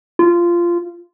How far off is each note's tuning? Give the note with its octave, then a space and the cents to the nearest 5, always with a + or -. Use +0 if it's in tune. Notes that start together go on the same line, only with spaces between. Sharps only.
F4 -15